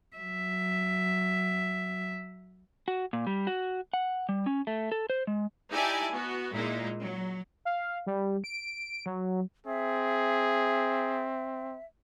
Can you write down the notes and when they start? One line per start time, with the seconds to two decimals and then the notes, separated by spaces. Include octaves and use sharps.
0.17 F#3 E5
2.88 F#4
3.13 A#2
3.27 G3
3.47 F#4
3.94 F#5
4.29 G3
4.46 C#4
4.67 A3
4.92 A4
5.10 C5
5.27 G#3
5.72 D#4 E4 G4 D5 G#5 A5
6.12 B3 F#4
6.54 A#2 G#3 D#4 E4
7.03 F#3
7.65 F5
8.07 G3
8.44 D7
9.06 F#3
9.66 C4 G#4 E5